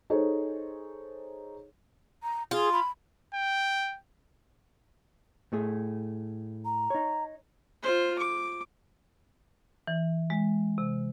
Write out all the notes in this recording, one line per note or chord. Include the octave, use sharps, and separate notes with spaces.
D#4 G#4 A4 C5 C#5
A#5
F4 G#4
B5
G5
A2 A3 G#4
A#5
D#4 C#5
F4 C5
D6
E3
G#3
C3